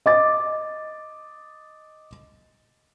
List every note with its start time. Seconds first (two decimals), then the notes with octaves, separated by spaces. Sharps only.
0.06 D#5 D6 A6